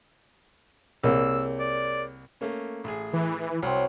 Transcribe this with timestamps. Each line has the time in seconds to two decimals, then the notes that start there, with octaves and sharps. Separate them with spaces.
1.03 C2 A#3 G#4 A#4 C#5 E6
1.60 D5
2.41 A3 A#3 C#4
2.84 A1 G#4
3.13 E3
3.62 C2 F#3 C4